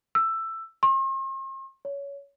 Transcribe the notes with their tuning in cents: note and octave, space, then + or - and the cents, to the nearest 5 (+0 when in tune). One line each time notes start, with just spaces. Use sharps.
E6 +10
C6 +45
C#5 +20